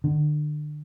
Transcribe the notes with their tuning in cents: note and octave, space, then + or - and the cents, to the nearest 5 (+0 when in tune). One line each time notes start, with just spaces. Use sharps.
D3 +35